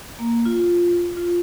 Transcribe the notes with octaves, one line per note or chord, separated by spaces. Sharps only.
A#3
F4
F4